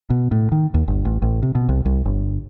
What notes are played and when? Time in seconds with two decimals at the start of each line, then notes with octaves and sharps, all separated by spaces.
0.10 B2
0.31 A2
0.52 D#3
0.74 D#2
0.88 G1
1.05 A1
1.22 A1
1.43 C3
1.55 B2
1.69 C2
1.85 C2
2.05 G1